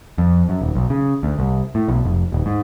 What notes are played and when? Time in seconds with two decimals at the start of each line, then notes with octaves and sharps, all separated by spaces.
0.18 F2
0.49 F#2
0.61 D#1
0.75 B1
0.90 C#3
1.23 D2
1.39 C2
1.75 A2
1.88 B1
2.05 F1
2.32 D#1
2.46 G#2